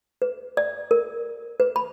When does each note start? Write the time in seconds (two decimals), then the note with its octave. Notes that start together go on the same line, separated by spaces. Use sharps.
0.22 B4
0.57 D5
0.91 A#4
1.60 B4
1.76 B5